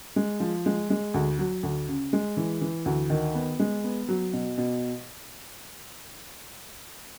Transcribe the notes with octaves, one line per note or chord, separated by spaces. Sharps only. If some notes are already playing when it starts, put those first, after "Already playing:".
G#3
F3
G#3
G#3
D2
F#3
D2
C#3
G#3
E3
E3
D2
D#3
B3
G#3
B3
F#3
B2
B2